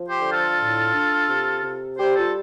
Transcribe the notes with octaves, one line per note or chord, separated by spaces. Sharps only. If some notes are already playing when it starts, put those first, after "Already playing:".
Already playing: F3
G4 C5
D3
F4 A4
A2
D4
C3
C3
G3 G4 C5
F4 A4